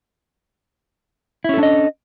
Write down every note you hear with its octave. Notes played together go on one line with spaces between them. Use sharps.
C#4 D4 E4 A4 D#5